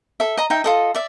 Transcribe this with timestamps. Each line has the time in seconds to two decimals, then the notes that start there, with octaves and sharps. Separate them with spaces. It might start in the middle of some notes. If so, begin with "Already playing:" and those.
0.20 A4 E5
0.37 D#5 A#5
0.50 D#4 E5 G5
0.64 F4 A4 D#5
0.95 D5 E5